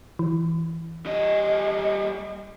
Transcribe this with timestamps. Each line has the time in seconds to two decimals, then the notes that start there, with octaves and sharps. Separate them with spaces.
0.19 E3
1.06 G3 D#5